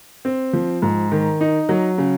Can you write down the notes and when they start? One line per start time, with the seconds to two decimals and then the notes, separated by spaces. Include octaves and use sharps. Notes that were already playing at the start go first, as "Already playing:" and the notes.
0.25 C4
0.53 F3
0.82 G#2
1.12 D#3
1.41 D#4
1.69 F#3
1.98 C#3